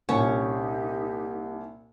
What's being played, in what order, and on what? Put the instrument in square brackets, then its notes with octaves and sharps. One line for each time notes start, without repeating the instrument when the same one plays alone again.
[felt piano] C2 A#2 [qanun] C#4 [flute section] D#4 G4